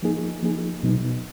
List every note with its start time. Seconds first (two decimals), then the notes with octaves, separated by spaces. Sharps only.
0.03 F3 A#3 D#4 G#4
0.43 F3 A#3 D#4 G#4
0.83 B2 F#3 B3 D#4